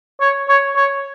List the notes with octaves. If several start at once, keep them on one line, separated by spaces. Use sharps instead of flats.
C#5
C#5
C#5